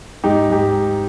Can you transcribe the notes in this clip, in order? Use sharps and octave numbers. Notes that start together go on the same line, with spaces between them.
G#2 D#4 G4
G#2 G4